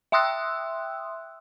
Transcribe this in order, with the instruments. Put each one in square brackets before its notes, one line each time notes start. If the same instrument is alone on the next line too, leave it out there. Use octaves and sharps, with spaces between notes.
[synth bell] E5 G5 C6 D#6 E6 F#6